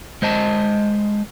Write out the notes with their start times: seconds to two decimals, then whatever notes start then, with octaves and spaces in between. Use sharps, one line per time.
0.22 G#3 C5 D#5 A5